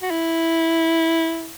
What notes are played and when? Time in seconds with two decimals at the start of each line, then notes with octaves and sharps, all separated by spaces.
0.02 F#4
0.10 E4